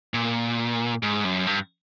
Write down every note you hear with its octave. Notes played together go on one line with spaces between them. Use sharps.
A#2
G#2
F#2
G2